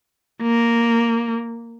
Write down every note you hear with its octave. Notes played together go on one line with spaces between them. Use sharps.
A#3